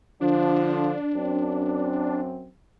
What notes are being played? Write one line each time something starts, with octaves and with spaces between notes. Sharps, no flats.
D3 F3 D4
F#2 C4